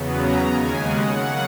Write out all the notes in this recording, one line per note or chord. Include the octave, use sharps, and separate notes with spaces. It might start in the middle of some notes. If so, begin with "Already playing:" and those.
Already playing: E2 C#3 F#3 B3
A#5
D#2 C#3 G#3 G#5
F#5
C#3 F#3 A#3 F#5